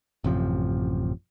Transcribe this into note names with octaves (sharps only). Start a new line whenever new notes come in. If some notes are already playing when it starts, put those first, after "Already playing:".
A1 F#2 C3 F3